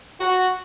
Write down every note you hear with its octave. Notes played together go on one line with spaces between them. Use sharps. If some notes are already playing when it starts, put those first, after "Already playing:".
F#4